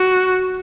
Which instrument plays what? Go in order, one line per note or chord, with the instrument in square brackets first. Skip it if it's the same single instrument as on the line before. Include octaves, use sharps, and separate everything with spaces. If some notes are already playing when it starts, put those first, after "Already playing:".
Already playing: [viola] F#4